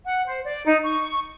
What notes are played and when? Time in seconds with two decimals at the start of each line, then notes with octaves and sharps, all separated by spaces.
0.05 F#5
0.27 C5
0.44 D5
0.66 D#4
0.84 C#6